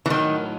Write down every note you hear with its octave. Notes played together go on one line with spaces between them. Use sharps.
E3
A2 D#3 F#3 B3 D#4